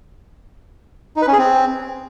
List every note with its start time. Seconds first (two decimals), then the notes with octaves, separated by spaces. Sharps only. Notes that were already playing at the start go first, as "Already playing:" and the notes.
1.16 D#4
1.22 B4
1.27 C#4
1.33 G#4
1.39 C4